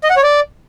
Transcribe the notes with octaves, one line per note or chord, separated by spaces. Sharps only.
D#5
F#5
C#5
D5